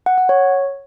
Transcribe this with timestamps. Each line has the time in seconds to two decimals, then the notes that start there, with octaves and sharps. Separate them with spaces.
0.06 F#5
0.18 F#5
0.29 C#5